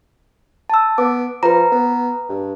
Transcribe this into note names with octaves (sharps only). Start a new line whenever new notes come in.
A5 E6
B3 D6
F3 B4 A#5
B3
G2